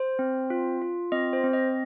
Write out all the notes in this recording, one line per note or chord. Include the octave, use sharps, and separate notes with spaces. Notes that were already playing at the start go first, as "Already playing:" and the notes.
Already playing: C5
C4
F4
F4
C4 D#5
C5
C4
D#5